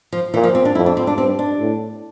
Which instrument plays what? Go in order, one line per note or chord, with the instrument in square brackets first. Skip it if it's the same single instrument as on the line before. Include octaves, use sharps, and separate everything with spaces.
[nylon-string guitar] F3
[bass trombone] A#2 [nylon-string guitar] E3
[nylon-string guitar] F3
C4
D4
[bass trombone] F2 [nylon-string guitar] E4
[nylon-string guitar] D4
C4
D4
[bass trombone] G2 [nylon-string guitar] C4
[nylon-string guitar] D4
[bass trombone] A2